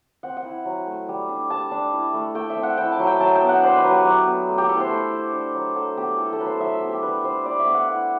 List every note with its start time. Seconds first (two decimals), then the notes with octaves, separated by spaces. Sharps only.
0.23 C4 F#5
0.37 F#5
0.45 E4
0.65 F#3
0.86 A3
1.09 G3
1.29 D4
1.50 G3 A5
1.71 D4
1.92 E4
2.14 A3
2.35 A3 G5
2.50 E5
2.56 C4
2.63 F#5
2.78 E4 G5
2.92 A5
2.99 F#3
3.07 G5
3.21 F#3 A5
3.35 G5
3.42 B3
3.49 F#5
3.62 D4 C5
3.77 B4
3.85 F#3
3.92 G4
4.05 F#3
4.26 B3
4.49 A3
4.58 G4
4.69 E4 A4
4.80 C5
4.90 A3
5.12 E4
5.33 D4
5.54 F#3
5.75 F#3 A4
5.97 B3 G4
6.18 E4 A4
6.33 A4
6.39 F#3 B4
6.46 C5
6.60 F#3 E5
6.75 E5
6.82 B3
6.89 G4
7.02 D4 B4
7.24 G3 C5
7.45 G3 D5
7.60 E5
7.66 B3
7.74 F#5
7.87 E4 F#5